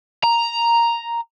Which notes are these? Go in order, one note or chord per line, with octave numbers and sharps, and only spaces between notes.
A#5